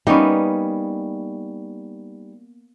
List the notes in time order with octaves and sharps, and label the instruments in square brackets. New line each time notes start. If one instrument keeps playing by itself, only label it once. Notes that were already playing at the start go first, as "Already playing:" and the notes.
[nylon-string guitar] G3 D#4 [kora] A#3 B3 C#4